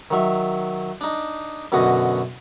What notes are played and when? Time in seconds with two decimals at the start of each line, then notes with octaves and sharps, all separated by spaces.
0.11 D#3 F#3 E5
1.01 D4 D#4
1.72 F#2 B2 D3 F#4 D#5